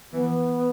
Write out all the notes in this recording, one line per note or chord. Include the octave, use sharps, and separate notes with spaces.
E3 B3